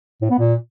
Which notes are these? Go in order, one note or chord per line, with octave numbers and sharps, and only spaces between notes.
A2
B3
A#2